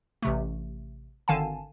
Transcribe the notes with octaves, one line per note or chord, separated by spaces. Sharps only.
A1 C3 A3
G#1 D3 D#3 F5 G#5 A5